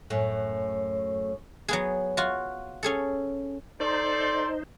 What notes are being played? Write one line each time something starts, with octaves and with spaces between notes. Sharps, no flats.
F#2 A2
F#3 B3 G#4
F4 F#4
C#4 G#4 A4
D#4 A4 C5 D5 C6